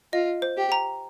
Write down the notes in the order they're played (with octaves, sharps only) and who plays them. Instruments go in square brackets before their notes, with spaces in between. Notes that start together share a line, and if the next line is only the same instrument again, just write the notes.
[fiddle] F4 [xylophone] D#5
[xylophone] C5
[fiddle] G4
[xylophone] A#5